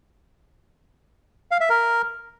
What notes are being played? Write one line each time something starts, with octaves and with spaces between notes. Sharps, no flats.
F5
E5
A#4